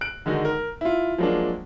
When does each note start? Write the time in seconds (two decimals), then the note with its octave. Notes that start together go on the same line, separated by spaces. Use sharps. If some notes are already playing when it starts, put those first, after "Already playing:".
0.01 F#6 D7
0.26 D3 D#3 G#3 D#4 F#4
0.45 A#4
0.81 E4 F4
1.18 F3 F#3 G#3 A#3 D4